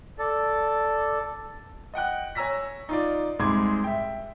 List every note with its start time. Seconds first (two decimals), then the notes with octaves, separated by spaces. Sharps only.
0.19 A4 D5
1.94 D#5 F#5 G5 F#6
2.35 C#5 G#5 A#5 E6 A#6 B6
2.89 D#4 F4 D5
3.39 C2 G#2 G#3 C6 D6 G#6
3.84 E5 G5